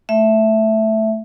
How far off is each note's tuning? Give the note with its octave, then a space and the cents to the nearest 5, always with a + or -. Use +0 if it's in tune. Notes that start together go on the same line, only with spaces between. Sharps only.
A3 +0 E5 +0